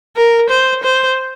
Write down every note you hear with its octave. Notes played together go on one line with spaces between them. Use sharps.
A#4
C5
C5